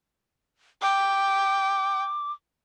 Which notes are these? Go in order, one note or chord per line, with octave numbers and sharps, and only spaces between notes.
G5 D6